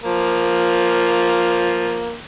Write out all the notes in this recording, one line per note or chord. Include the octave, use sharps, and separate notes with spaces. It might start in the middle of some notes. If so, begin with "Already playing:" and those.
F3 A#3